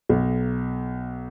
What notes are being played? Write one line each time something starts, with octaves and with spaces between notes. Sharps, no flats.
B1